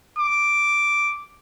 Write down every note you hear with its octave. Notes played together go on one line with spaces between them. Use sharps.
D6